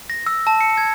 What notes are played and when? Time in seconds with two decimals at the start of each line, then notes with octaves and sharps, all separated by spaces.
0.10 A#6
0.26 E6
0.47 A5
0.61 C#7
0.77 G#6